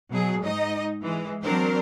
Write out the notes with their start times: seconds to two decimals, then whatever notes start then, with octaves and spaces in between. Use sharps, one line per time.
0.10 B2 F#3 G#4
0.42 G#2 D#4 D#5
1.02 E3 G#3
1.42 F#3 C4 D4 A#4 C5